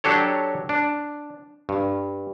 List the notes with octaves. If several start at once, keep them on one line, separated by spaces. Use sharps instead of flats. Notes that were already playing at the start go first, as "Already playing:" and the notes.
F#3 D4 G4 A4 C#5
D4
G2